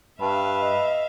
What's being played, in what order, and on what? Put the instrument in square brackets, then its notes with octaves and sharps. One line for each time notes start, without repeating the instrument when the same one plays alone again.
[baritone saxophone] G2 [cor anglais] B4 [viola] E5 F5
[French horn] D#5